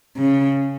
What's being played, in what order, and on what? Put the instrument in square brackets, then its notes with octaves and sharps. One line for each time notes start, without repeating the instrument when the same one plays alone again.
[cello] C#3